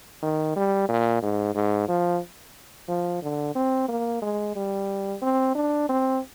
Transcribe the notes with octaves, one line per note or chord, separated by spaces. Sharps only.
D#3
G3
A#2
G#2
G#2
F3
F3
D3
C4
A#3
G#3
G3
C4
D4
C4